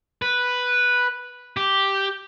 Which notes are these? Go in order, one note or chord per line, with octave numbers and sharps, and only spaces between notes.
B4
G4